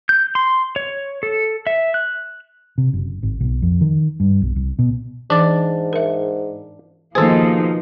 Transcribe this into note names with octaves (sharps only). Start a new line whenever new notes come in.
G6
C6
C#5
A4
E5
F#6
C3
F#1
G#1
B1
F2
D#3
G2
B1
C2
B2
G#2 E3 D4 D5
A#4 E5
B2 D#3 F3 A#3 D#4 G#4 A4 C5